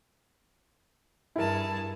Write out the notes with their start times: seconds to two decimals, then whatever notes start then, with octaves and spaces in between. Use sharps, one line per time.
1.36 G2 E4 G#4 A#4 A5